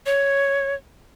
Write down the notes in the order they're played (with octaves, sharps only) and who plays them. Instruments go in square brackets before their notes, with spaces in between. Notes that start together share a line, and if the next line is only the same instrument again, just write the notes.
[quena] C#5